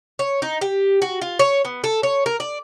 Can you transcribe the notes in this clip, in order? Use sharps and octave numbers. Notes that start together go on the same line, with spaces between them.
C#5
D#4
G4
F#4
F4
C#5
B3
A4
C#5
A#4
D5